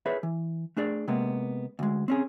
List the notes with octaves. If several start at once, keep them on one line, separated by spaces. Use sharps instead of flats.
G#4 B4 C#5 E5
E3
A3 D4 G#4 D5
C3 G#3 A#3 B3
D2 G#3
C4 C#4 G#4